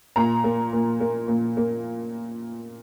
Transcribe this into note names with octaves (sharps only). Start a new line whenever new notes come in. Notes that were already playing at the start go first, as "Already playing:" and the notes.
A#2 A#5
A#3
A#2
A#3
A#2
A#3